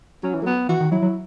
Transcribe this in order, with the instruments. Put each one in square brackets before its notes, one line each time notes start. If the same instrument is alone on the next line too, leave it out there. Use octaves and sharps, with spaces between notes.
[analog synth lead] F#3 [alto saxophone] C#4
[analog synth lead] E3
[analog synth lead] F#3 [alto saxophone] A3
[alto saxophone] B3
[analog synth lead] E3 [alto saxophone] F#4
[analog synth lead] D#3
[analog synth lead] F#3 [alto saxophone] E4
[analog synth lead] F#3